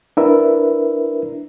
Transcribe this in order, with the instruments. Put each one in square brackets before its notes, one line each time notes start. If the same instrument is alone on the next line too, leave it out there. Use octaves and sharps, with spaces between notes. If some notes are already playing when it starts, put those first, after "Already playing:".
[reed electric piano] D4 E4 A#4 B4 E5